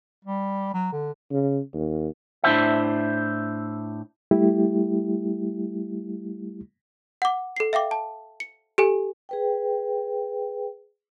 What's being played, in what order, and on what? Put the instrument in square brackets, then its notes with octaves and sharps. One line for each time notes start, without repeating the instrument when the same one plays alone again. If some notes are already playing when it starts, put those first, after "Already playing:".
[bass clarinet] G3
F#3
D3
[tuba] C#3
D#2
[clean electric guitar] A2 D4 E4 C5 E5
[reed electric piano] G3 A3 E4 G4
[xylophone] F#5 D6
A4 C7
E5 F5 G5 D6
A5
C#7
G4 A4 G#5
[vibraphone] G#4 B4 G5